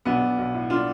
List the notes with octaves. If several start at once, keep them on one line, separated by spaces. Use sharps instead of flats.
B1 B3 D4
B1
B1
A2
D4 F4